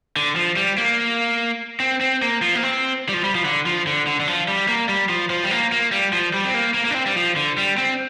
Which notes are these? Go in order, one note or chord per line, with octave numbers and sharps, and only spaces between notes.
D3
F3
G3
A#3
C4
C4
A#3
F3
A#3
C4
G3
F3
G3
F3
D3
F3
D3
D3
D3
F3
G3
A#3
G3
F3
F3
G3
A#3
A#3
G3
F3
G3
C4
A#3
A#3
A#3
D4
C4
G3
F3
D3
G3
C4